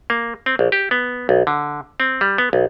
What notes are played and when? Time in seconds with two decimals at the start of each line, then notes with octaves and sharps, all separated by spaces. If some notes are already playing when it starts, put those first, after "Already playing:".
0.10 A#3
0.46 C4
0.59 A#1
0.72 G4
0.91 B3
1.29 B1
1.47 D3
2.00 C4
2.21 G3
2.38 B3
2.53 B1